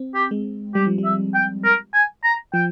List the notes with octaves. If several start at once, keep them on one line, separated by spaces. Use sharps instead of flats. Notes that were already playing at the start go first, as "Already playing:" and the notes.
Already playing: C4
G4
G#3
G3 G4
F3
G3
E5
G5
A#4
G#5
A#5
F3 G5